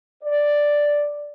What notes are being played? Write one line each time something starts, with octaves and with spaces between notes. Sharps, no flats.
D5